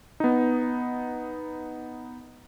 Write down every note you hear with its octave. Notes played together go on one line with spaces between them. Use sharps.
B3 D#4